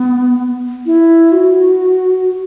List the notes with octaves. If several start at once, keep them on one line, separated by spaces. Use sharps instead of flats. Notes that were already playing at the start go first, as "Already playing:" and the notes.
Already playing: B3
E4
F#4